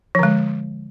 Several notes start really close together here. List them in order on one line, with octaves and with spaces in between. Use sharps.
F3 D3 G#3